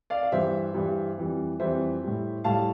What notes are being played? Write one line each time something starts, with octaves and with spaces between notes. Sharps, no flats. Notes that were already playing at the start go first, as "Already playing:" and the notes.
D5 F5
F5
G2 E3 G3 C5 E5
G2 E3 G3
F2 E3 G3
F2 E3 G3 C5 E5
A2 G3
A2 G3 F5 A5